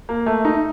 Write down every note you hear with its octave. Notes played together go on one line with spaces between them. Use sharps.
A#3
A3
D#4